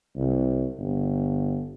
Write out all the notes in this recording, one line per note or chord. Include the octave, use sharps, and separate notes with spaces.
C2
G1